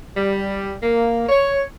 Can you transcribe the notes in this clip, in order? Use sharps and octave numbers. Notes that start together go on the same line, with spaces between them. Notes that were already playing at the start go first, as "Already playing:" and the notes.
G3
A#3
C#5